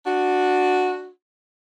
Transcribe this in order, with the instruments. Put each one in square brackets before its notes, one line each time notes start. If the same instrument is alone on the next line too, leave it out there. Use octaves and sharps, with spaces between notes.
[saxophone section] D4 F#4